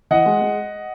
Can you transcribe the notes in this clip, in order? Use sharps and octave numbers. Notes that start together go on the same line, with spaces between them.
E3 D#5 F#5
G#3
G#3